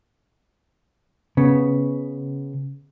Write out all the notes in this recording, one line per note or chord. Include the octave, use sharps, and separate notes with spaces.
C#3 B3